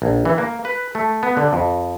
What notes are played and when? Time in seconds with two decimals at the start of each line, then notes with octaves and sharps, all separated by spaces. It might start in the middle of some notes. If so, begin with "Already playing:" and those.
0.02 A#1
0.25 E3
0.38 A#3
0.65 B4
0.95 A3
1.23 B3
1.37 D3
1.53 F2